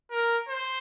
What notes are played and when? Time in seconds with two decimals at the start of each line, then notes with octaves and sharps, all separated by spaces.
0.11 A#4
0.49 C5